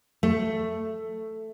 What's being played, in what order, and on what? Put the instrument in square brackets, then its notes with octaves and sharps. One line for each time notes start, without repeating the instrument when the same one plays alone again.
[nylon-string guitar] A3